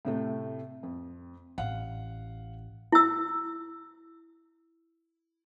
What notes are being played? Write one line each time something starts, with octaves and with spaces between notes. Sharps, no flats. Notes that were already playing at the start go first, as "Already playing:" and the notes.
A2 C3 A3
F2
A1 F5 F#5
E4 E6